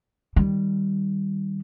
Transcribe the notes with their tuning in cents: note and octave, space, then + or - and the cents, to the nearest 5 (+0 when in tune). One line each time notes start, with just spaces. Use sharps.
D#3 +0 G3 -5